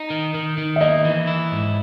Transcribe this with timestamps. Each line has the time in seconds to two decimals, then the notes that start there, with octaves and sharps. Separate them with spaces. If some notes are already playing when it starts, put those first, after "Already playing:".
Already playing: D#4
0.10 D#3
0.34 D#3
0.58 D#3
0.76 E5
0.81 A#3 D#5
1.05 E3
1.27 E4
1.52 G#2